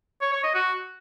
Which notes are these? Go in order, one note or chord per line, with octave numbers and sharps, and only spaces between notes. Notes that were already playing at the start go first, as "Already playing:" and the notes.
C#5
C#5
D#5
F#4